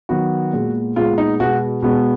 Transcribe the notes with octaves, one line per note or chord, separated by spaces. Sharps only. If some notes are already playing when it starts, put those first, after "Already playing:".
D#3 F#3 B3 F#4
A#2 G#3 B3
A#2 G#3 B3 F4
D#4
B2 G#3 B3 F#4
B2 G#3 B3